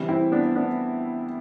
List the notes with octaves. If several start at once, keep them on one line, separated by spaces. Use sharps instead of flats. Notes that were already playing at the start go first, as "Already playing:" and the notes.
Already playing: C3 E3 G3
C4 E4
B3 D4
B3 D4